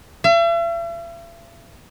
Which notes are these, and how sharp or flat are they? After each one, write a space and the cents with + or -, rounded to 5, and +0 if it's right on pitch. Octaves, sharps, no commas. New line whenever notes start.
E5 +45